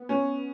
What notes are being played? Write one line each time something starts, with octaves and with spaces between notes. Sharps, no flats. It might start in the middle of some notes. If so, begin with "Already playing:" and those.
Already playing: B3
C#4